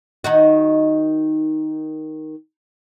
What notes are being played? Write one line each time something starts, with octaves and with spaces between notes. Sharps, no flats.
D#3 D#4 F#4